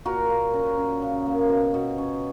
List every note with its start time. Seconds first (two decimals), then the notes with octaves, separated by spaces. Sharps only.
0.06 A#2 F#4 A#4
0.30 A#2
0.54 C#4
0.77 C#4
1.02 C#3
1.26 A#3
1.49 B2
1.74 B2
1.98 C#4